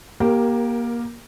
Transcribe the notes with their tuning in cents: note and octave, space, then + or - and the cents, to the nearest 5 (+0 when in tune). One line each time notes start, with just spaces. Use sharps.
A#3 +25 G4 +0 A#4 +0